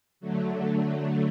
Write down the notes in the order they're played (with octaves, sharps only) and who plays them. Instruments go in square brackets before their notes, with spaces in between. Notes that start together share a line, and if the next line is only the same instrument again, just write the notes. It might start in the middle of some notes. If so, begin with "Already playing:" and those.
[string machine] D3 F#3 A3